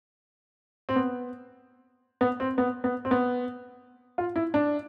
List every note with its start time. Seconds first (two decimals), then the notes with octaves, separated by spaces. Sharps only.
0.89 C4
0.96 B3
2.21 B3
2.40 C4
2.58 B3
2.84 B3
3.05 C4
3.11 B3
4.18 F4
4.36 E4
4.54 D4